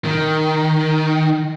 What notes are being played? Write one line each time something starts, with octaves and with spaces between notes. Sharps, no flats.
D#3